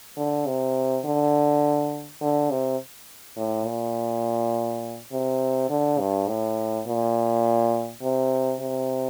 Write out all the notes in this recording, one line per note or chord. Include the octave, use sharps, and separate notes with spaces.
D3
C3
D3
D3
C3
A2
A#2
C3
D3
G2
A2
A#2
C3
C3